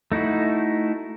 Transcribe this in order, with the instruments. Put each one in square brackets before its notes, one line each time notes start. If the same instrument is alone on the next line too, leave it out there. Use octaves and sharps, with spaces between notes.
[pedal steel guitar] A3 D#4 E4 F#4